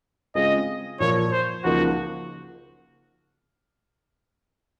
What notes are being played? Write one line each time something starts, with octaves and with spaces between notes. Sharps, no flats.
C#3 G#3 C4 F4 G#4 D#5
A#2 F3 A#3 C#5
C5
C#2 C#3 F3 A#3 D#4 F#4